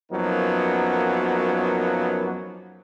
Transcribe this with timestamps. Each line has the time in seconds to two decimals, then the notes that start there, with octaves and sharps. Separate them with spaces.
0.12 F#2 F3 F#3 A#3 B3 D#4